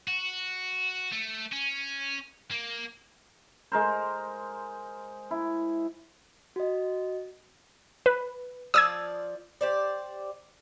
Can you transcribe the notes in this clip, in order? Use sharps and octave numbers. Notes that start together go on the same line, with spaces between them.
F#4
A3
C#4
A#3
G#3 A#4 C5
E4
F#4 D#5
B4
F3 D5 F5 D#6 E6 G#6
G4 C5 D5